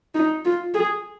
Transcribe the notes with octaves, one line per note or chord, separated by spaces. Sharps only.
D#4
F4
G#4